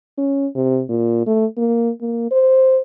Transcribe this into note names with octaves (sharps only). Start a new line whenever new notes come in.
C#4
C3
A#2
A3
A#3
A#3
C5